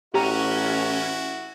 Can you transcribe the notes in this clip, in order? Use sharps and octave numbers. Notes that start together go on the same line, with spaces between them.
A1 C#4 E4 F#4 G4 A#5